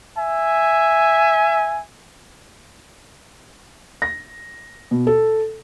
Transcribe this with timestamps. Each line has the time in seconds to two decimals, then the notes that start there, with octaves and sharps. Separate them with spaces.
0.17 E5 G#5
4.02 A#6
4.91 B2
5.07 A4